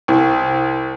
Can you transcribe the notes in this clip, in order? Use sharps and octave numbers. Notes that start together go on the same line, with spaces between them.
C2